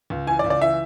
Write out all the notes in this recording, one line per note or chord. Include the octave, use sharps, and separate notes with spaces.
C#2
E3 G#5
D5
C#2
D5
E3 E5